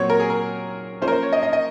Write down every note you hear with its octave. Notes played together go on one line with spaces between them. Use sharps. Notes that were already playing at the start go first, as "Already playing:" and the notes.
Already playing: A#2 F#3 C4 C#5
A#4
G#4
A#4
F3 A#3 C#4 C5
A#4
C5
C#5
D#5
D#5
D#5